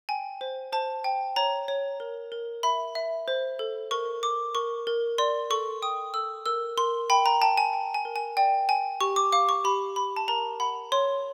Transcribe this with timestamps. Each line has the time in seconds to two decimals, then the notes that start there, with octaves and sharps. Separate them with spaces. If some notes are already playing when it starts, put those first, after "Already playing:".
0.09 G5 G#5
0.41 C5
0.72 C5 A5
1.04 G5
1.36 C#5 A#5
1.68 C#5
2.00 A#4
2.32 A#4
2.63 E5 B5
2.95 E5
3.28 C5
3.59 A4
3.91 A#4 C#6
4.23 A#4 D6
4.55 A#4 C#6
4.87 A#4
5.18 D5 C6
5.50 A4 C#6
5.82 G5 D#6
6.14 A4 E6
6.46 A#4 E6
6.78 A#4 C6
7.10 G5 B5
7.26 A#5
7.41 G5 A5
7.58 G#5
7.73 G5
7.94 G#5
8.05 A#4
8.16 G#5
8.37 D5 G5
8.69 G5 G#5
9.01 G4 C#6
9.16 D6
9.32 F5 D6
9.49 C#6
9.64 G4 B5
9.96 G4 B5
10.16 A5
10.28 A#4 A#5
10.60 F#5 B5
10.92 C#5 C6